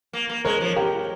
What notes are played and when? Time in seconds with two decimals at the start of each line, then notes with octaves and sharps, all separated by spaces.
0.13 A#3
0.29 A#3
0.45 G#3 A#4 C#5
0.61 F3
0.76 G4 A#4